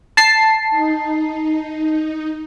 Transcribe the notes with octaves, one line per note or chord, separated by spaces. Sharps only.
A5 C7
D#4